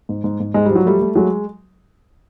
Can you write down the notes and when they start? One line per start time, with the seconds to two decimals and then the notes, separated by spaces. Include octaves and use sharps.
0.09 G#2
0.24 G#2
0.40 G#2
0.54 G#2 G#3
0.65 F3 G3
0.76 F#3
0.86 G3 A3
1.01 A3
1.15 F#3 G#3